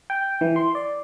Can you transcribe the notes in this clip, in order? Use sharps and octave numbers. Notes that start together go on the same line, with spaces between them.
G5
E3
C6
D5